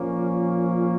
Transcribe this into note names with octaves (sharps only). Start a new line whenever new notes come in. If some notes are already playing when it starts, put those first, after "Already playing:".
Already playing: A#2 F3 A#3 C#4